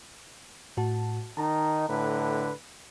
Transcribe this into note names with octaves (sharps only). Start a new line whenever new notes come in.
A2 F#4 A5
D#3 D#4 A5 A#5
A2 D3 B4